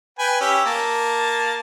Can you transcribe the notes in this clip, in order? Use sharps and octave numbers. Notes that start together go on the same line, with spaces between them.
B4 G5 G#5
C#4 G4 E5
A#3 A5